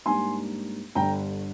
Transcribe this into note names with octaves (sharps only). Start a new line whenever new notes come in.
G#2 G3 A#3 D4 G#5 C6
G1 G2 D3 G5 A#5